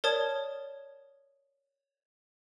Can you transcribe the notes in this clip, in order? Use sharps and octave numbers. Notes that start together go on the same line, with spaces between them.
A#4 C#5 D5 A5 D#6 G#6